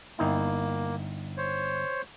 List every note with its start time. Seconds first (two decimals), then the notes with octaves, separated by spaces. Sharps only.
0.19 G1 A#3 D#4 E4
1.37 C5 C#5